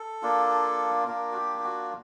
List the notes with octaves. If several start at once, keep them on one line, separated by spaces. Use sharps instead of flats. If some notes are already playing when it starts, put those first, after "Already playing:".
Already playing: A4
A#3 D4 F4
A#3 D4 F4 A#4
F#4
G4
G4
F#4